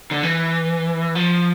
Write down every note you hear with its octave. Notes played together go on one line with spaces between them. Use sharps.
D3
E3
F3